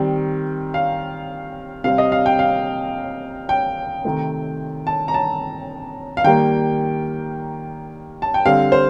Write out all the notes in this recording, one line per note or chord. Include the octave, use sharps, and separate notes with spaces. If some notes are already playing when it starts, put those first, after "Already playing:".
Already playing: D#3 G3 C4
F5
C3 G3 C4 F5
D#5
F5
G5
F5
G5
C3 D#3 A3 C4
A5
A#5
A5
F5
D#3 G3 A#3 G5
A5
G5
D3 G3 C4 F5
C5